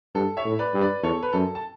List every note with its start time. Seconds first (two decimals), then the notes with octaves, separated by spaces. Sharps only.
0.15 G2 A4
0.37 C#5 E5
0.45 A2
0.59 B4 D5
0.74 G2
0.81 B4 D5
1.03 E2 A4 C#5
1.23 B4
1.33 F#2 A4
1.55 A5